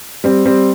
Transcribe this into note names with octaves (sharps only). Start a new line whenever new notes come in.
G3 C4
G3 C4